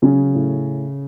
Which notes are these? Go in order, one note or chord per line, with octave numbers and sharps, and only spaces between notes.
C#3 F#3 C#4
A2